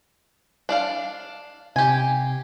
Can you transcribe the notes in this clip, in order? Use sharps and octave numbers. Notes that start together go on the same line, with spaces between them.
D4 D5 F5
C3 G4 G#5